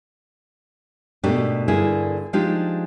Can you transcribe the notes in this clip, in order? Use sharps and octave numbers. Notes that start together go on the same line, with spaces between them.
G#2 B2 A3 D4 G4 A#4
G2 D3 A#3 D4 E4 G#4
F3 G#3 D4 D#4 F4 G4